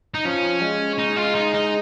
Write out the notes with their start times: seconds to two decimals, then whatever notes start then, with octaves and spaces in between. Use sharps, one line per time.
0.14 D#4
0.25 F3 C#4
0.61 G#3
0.98 D#4
1.16 F4
1.35 D#4
1.54 D#4